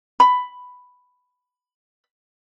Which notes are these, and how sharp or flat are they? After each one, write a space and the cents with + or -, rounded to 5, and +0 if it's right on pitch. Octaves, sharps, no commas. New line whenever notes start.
B5 +5